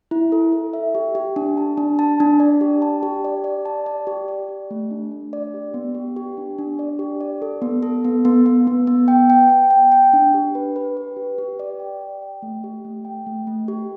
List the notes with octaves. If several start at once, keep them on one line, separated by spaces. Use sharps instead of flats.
E4
A4
A4
E5
G4
G4
D4
A5
D4
A5
D4
D5
G4
A5
G4
D5
D5
A5
D5
G4
D5
G4
A3
D4
D4
D5
G4
B3
G4
G4
D4
D4
D5
G4
D5
A4
B3
A4
B3
B3
B3
B3
B3
G5
G5
G5
G5
G5
D4
G4
B4
B4
B4
G4
G4
D5
G5
D5
G5
A3
G4
A3
G5
A3
A3
G4